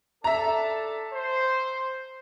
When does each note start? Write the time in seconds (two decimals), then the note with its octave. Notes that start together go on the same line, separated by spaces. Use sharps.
0.24 D4 A4 E5 A5 A#5
1.13 C5